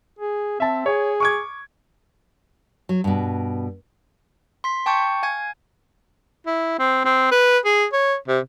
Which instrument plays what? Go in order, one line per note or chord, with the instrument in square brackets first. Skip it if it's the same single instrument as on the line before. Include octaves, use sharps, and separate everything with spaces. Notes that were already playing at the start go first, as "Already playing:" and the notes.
[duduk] G#4
[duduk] C4 [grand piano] E5 A5
[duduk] G#4 [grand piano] C#5
[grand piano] C#6 D6 G#6
[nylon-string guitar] F#3
G2 B2
[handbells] C6 B6
G5 A5 C#6 D6 G6 C#7
F5 G#5 G#6
[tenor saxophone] E4
C4
C4
B4
G#4
C#5
C3